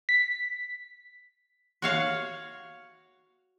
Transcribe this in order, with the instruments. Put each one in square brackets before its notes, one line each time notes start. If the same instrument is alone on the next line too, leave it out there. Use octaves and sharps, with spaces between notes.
[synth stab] B6
[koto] F#4 C#5 F5